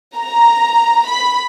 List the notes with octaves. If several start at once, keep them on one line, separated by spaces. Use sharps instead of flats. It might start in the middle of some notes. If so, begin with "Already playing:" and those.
A#5
B5